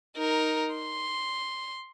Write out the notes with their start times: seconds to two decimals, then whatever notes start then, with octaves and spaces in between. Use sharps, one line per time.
0.17 D#4 A#4
0.75 C6